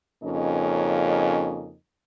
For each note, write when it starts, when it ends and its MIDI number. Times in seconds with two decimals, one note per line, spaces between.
0.23 1.75 41
0.23 1.75 49
0.23 1.75 58
0.23 1.75 61
0.23 1.75 63
0.23 1.75 75